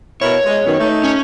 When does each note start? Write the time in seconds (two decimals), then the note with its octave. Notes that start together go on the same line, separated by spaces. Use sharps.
0.21 B2 E4 A#4 C#5
0.45 G#3
0.65 F#2 B2 D#3
0.79 A3 D#4
1.04 C#4